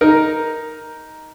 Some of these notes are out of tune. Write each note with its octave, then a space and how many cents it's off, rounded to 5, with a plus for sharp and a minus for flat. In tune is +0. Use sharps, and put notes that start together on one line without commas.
D#4 +5 A#4 +0